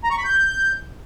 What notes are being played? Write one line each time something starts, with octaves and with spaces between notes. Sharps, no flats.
A#5
C#6
B5
G6